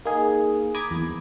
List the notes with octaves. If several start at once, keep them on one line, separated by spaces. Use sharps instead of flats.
A#3 D#4 G#4
A#5 B5 D6 D#6 G#6 B6
E2